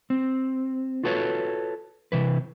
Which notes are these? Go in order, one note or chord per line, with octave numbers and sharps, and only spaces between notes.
C4
F4 F#4 A4 B4 C#5
C3 E3 B4